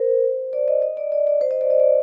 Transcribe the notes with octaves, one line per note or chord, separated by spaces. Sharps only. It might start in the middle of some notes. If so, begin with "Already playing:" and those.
Already playing: A#4 C5
D5
D#5
D#5
D5
D5
D5
C5
D#5
D5
D#5
D5